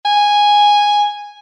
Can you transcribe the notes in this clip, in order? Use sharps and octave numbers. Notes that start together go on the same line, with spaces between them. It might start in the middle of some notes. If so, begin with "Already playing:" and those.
G#5